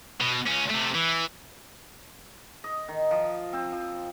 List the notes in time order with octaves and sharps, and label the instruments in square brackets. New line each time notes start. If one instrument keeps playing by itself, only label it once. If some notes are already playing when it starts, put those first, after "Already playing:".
[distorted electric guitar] B2
C#2 C#4
C3 A3
E3
[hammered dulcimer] D#5
D#3
F3
C4
F3